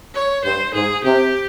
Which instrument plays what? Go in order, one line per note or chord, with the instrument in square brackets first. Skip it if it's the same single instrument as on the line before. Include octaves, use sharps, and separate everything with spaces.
[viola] C#5
[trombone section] G2 [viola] C5
[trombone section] G#2 [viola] G#4
[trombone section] C3 [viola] G4